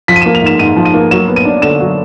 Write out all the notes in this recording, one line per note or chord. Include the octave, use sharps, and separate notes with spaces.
F3 B6
D#7
A#3 E7
F7
G#2 E7
G#2 D#7
F3
D#7
A#3
F#3 E7
B3
D#7
D4
D3 E7
F#3